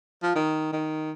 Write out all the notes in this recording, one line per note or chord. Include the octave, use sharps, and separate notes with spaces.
F3
D#3
D#3